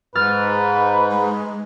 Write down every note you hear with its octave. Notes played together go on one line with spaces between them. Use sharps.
G#2 B4 F6 A6
G#3